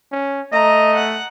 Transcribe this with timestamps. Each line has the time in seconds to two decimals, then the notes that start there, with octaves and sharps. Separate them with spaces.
0.12 C#4
0.53 A3 D#5 A#5
0.96 F#5